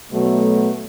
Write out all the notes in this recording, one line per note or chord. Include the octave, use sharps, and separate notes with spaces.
B2 F#3 A3